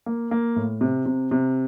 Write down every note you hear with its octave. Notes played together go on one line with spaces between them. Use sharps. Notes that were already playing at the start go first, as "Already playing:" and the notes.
A#3
A#3
A2
C3
C3
C3